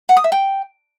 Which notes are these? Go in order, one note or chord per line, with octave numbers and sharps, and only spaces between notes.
F#5
D#6
E5
G5